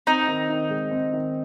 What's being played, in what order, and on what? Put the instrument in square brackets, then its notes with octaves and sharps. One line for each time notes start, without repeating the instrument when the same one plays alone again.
[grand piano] C4 [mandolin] D#4
[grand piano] D#3
D#3
G#3
C4
D#3